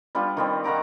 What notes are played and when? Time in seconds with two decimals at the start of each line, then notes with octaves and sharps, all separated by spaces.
0.15 G3 B3 D4 F4
0.37 D#3 G3 C4
0.64 D#3 F#5 A#5 D6